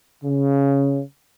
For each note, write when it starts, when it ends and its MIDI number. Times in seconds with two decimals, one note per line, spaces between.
0.24 1.01 49